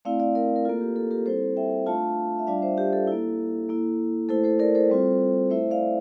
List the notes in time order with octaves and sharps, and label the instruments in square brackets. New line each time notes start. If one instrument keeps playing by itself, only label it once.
[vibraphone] A3 C4 E4 D5 F5
D5 F5
A#4 D5
A#4
A#3 F4 A4
G4
A4
G4 A#4
G3 C4 E4 A4 C5
E5 G5
A3 D4 F4 F5 A5
E5
G3 D4 F4 D5 F5
C5 E5
G4
A4
A#3 E4
A#3 E4
A3 E4 A4 C5
A4 C5
A#4 D5
A4 C5
G3 C4 F4
A3 E4 C5 E5
D5 F5